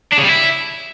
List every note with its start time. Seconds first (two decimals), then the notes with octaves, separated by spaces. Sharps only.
0.12 D4
0.18 C#3
0.23 G3
0.29 E4